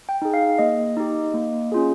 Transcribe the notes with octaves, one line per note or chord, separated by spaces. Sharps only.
G5
D#4 G#4
F5
A#3 D#5
D#4 G4
A#3
C#4 F4 G#4